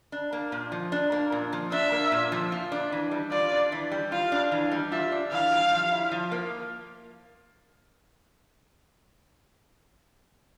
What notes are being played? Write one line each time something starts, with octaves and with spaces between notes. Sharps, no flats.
D4
A#3
A#2
F3
D4
A#3
A#2
F3
D4 E5
A#3
A#2
F3
F4
D4
E3
G3
F4 D5
D4
E3
G3
F4 F5
D4
E3
G3
F4 E5
D4
E3 F5
G3
F3
E4
F3
A#3